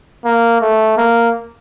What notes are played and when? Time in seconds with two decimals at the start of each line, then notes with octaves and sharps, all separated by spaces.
0.24 A#3
0.61 A3
0.97 A#3